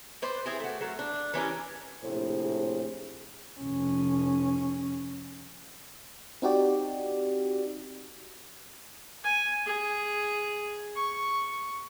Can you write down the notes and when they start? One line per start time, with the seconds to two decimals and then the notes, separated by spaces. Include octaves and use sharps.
0.22 B4 C5 D5
0.46 C4 E4 G4 G#4
0.60 A3 F#4
0.81 F#3 A3 A4 A#4
0.99 D4
1.34 E3 C#4 G4 A#4
2.04 A#1 A2 C3 G#4 C5
3.60 F1 C#4
6.42 C4 D#4 F#4 G4 D5
9.24 G#5
9.66 G#4
10.95 C#6